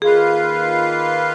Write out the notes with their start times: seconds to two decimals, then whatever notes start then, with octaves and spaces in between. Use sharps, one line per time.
0.02 D#3 A#3 F4 G#4 B4 F5